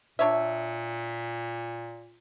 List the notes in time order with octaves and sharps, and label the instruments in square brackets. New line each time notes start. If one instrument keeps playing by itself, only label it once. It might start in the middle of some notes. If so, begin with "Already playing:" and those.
[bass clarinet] A#2 [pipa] D4 C#5 E5